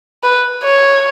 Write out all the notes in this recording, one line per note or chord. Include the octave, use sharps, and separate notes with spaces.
B4
C#5